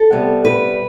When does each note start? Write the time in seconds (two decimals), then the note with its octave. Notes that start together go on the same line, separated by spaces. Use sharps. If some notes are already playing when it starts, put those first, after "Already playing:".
Already playing: A4
0.11 C3 G3 B3
0.45 B4